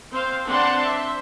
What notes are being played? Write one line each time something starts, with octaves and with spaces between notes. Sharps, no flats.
C4 C5 F5
C4 D4 B4 F#5 A5 C6
C5 E5